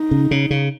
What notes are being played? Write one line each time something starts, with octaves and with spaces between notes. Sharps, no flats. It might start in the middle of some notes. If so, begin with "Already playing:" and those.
Already playing: D#4
C#3
C#3
C#3